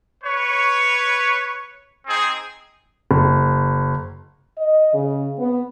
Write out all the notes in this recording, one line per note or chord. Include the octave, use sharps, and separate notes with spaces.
B4 C#5
C4 D#4 G#4
F#1
D#5
C#3
B3